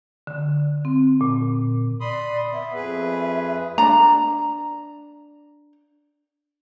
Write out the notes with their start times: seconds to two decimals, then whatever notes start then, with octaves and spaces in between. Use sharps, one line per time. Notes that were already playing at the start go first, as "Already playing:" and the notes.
0.27 D3
0.85 C4
1.21 A#2
2.01 D5 B5 C6 D#6
2.52 B3 E5
2.75 F2 G#4 B4
3.78 D4 A#5